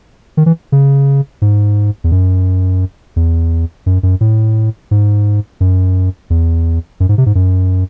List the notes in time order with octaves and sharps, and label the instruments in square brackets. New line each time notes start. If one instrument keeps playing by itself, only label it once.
[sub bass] D#3
E3
C#3
G#2
E2
F#2
E2
F#2
F#2
A2
G#2
F#2
E2
F#2
G#2
C3
G#2
F#2